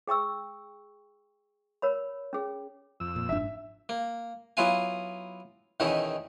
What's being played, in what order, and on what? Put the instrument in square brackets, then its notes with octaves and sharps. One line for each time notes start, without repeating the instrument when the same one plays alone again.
[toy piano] G#4 G5 C#6 E6
A#4 C#5 B5
C#4 G#4
[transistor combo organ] F2 E6
[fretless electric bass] A#2
[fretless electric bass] F#1 G#2 D4 [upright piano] E5
[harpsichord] A#3
F#3 B3 E4 F4 F5 G#5
E2 B2 D#3 C#4 D#4 E4